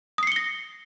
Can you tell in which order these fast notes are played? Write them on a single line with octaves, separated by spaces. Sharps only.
D#6 C7 C#7 G7 A#6